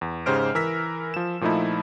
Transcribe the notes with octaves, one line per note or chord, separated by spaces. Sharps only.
E2
G#2 C#3 G4 C5 F6 D7
E3 A#4 E6 B6
F3 E7
A#2 F3 A3 D#4 E4